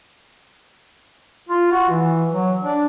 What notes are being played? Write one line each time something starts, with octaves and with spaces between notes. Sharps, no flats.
F4
F#4
E3
F#3
D4